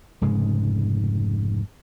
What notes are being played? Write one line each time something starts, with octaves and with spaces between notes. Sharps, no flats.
F1 G#2 C#3 G#3